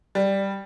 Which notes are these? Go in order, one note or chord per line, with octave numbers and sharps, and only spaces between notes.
G3